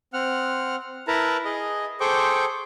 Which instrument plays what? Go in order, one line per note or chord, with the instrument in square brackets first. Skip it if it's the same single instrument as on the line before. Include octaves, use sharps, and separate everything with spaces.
[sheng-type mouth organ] C4 F#5 F6
E4 A#4 B4 A5 A#5
G#4 D#5
G#4 A4 C5 G5 C#6 D6